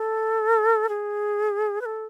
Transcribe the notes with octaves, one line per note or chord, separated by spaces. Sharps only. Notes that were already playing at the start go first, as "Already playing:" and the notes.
Already playing: A4
G#4
B4
A4